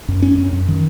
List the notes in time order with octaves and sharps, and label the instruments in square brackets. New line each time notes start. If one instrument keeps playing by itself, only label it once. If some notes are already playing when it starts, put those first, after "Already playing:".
[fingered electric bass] F#2
C#4
F#2
F#2
D#3